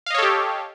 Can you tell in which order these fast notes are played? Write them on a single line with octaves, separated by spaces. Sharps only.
F5 D#5 C#5 A4 G4